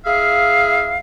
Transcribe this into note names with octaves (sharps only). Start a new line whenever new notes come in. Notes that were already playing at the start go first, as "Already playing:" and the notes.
E4 G#4 E5 F5